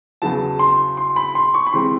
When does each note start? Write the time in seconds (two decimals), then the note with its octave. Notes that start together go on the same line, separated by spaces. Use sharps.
0.22 E2 C#3 F#3 B3 A5
0.59 C6
0.97 C6
1.16 B5
1.35 C6
1.54 C#6
1.66 B5
1.73 C3 E3 G#3 C4 C6